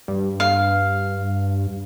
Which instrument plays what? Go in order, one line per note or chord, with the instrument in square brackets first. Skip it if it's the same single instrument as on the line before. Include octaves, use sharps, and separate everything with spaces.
[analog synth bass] G2
[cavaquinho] F5